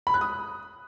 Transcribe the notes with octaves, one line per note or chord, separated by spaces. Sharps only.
B5
F#6
D#6